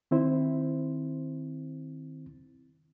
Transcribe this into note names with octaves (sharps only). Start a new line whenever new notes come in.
D#3 C4 E4 C5